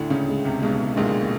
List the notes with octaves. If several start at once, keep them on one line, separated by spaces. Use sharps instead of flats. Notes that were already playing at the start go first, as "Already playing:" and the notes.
Already playing: D2 A2 D3
C#2 C#3
G#3
C2 C3
B1 B2 G#3
A#1 A#2 G#3